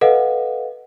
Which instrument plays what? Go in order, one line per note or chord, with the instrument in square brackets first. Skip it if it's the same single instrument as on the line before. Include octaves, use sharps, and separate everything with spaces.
[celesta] A4 B4 D#5 F5 F#5